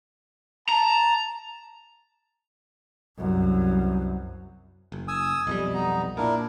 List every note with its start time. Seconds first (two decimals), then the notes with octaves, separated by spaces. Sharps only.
0.69 A5 A#5
3.17 C2 F#2
4.92 F#1
5.08 G#5 D#6 E6
5.47 B1 F2 G3 D#5
5.74 B3 D#4 A#5
6.17 A#2 D4 E4 A#4